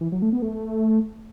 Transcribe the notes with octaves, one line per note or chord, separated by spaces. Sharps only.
E3
F#3
A3
B3
A3